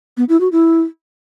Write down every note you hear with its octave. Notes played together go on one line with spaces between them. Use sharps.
B3
E4
F#4
E4